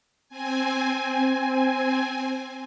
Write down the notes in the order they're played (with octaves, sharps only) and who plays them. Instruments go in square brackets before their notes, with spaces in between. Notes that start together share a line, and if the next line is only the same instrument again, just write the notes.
[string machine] C4 G#5